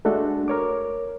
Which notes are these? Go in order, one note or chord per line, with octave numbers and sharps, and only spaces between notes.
G#3 A3 D4 F#4 A4
A#4 C#5 D6